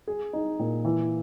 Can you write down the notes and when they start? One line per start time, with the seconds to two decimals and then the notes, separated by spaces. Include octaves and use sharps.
0.07 G#4
0.33 D#4
0.59 A#2
0.85 E3